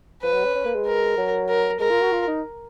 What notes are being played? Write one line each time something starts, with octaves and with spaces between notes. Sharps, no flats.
F3 B4
F#3
C#4
C#4
A#3
G#3
A#4
F#3
A#4
G#3 A#4
F4
F#4
F4
D#4